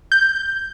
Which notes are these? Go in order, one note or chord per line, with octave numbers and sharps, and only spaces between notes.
G6